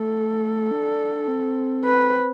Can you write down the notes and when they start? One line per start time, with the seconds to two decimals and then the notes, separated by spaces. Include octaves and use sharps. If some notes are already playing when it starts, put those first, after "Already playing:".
Already playing: A3 A4
0.71 D4
1.28 C4
1.85 B4